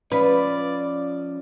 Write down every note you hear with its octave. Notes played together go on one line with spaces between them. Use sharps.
F3 C#4 F4 B4 D5